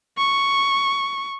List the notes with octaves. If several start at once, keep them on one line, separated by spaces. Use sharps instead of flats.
C#6